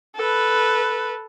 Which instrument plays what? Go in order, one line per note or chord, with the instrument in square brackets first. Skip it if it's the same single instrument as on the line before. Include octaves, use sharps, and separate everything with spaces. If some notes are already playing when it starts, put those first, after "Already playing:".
[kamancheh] A4 B4